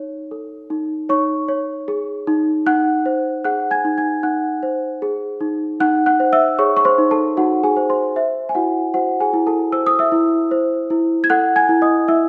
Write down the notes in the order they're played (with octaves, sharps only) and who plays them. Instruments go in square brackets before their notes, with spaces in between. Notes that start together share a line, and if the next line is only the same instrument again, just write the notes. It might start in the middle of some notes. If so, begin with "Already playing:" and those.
Already playing: [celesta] D#4 C#5
A4
D#4
D#4 C#5 C#6
C#5
G#4
D#4
D#4 F#5 F#6
C5
G#4 F#5 F#6
G#5 G#6
D#4
G#5 G#6
D#4 F#5 F#6
C5
G#4
D#4
D#4 F#5 F#6
F#5 F#6
C5
E5 E6
G#4 C#5 C#6
C#6
C5 C6
D#4
A4 A5
D#4 F#4 F#5
G#4 G#5
C5
C5 C6
C5 E5
G#5
E4 F#4 F#5
F#4 C5 F#5
G#4 G#5
E4
A4 A5
C5 E6
D#6
E5 E6
E4
C5
E4
G#6
A4 F#5 F#6
G#5 G#6
E4
D#5 D#6
E4 E5 E6